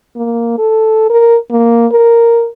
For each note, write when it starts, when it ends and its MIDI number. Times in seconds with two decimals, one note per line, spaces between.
0.16 0.55 58
0.59 1.07 69
1.10 1.36 70
1.51 1.87 58
1.92 2.48 70